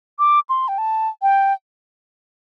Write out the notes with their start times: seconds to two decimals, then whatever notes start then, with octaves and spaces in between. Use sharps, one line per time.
0.19 D6
0.49 C6
0.68 G5
0.78 A5
1.22 G5